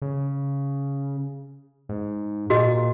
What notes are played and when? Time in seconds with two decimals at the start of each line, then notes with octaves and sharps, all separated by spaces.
0.02 C#3
1.89 G#2
2.50 A#2 F#4 G#4 D#5